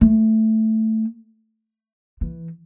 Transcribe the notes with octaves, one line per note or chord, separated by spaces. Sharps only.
A3
E3